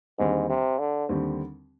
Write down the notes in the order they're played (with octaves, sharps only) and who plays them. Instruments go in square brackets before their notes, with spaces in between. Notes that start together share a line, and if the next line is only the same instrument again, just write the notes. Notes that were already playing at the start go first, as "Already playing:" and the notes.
[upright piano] D#2 D3 G3 C4 [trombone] G#2
[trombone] C3
D3
[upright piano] D#2 D3 G3 C4